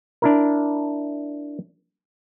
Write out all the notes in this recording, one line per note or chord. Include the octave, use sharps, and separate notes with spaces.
D4 E4 A#4